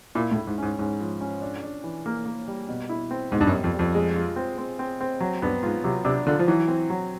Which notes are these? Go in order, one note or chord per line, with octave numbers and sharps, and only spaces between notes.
A#2 E4
A2
E4
G#2
G#2 C#4
G#2 C#4
F3
C#4
D4
D4
E3
A#3
A#3
G3
B2
E4
C4
G#2 B2
G2
F#2
G3
F2
G3
F2
G#3
F4
C4
C4
C4
C4
F#3
G2 B3
G#2 F4
C3 F#3
C3 D4
D3 F4
F3
E3 F#3
C4
F#3